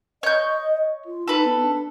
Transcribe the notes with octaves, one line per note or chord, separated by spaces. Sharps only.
C#5 D#5 G6
F4
D#4 A4 B4
B3
D4